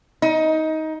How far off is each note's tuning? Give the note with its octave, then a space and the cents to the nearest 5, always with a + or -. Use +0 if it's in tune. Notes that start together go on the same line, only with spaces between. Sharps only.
D#4 +20